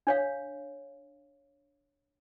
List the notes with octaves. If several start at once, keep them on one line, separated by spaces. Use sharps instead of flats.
D4 C#5 F5